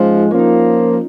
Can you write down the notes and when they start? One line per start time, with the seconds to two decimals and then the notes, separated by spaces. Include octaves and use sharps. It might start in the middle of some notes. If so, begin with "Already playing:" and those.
Already playing: G#2 F3 G#3 C#4 F4
0.31 F3 A#3 C#4
0.39 D#4